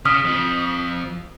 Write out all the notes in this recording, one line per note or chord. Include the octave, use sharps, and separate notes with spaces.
C#3 D#6 F6 B6
F2 F3